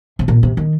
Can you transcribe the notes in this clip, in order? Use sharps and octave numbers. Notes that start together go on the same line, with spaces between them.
C3
A#2
C3
D#3